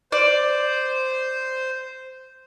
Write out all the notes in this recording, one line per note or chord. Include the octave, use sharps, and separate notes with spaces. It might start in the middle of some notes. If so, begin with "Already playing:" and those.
C5 D5